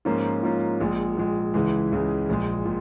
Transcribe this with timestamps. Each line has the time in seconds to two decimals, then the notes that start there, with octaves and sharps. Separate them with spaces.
0.05 G#2 F3 A#3 C#4 F4
0.43 G#2 F3 A#3 C#4 F4
0.80 A#1 A#2 G#3
1.17 A#1 A#2 G#3
1.54 C#2 C#3 E3 G#3
1.92 C#2 C#3 E3 G#3
2.29 A#1 A#2 G#3
2.65 A#2